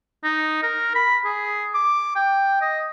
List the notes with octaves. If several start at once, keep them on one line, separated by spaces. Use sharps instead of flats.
D#4
A#4
B5
G#4
D6
G5
D#5